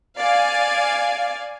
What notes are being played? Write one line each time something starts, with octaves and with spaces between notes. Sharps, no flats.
D5 F5 G#5